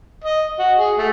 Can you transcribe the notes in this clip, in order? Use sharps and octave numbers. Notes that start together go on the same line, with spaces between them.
D#5
F#4
G#4
A3